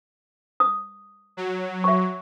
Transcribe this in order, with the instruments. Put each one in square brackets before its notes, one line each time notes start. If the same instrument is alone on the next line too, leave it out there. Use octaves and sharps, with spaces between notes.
[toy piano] D#6
[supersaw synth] F#3
[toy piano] E5 C#6